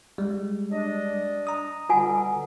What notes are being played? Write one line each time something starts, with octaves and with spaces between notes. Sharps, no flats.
G3 G#3
D4 D#5
A#5 D#6
B2 D3 G3 F4 F#5 G#5